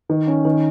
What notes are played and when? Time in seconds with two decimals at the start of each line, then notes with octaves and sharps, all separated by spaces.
0.09 D#3
0.27 C#4
0.45 D#3